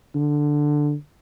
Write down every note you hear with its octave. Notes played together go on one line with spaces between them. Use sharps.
D3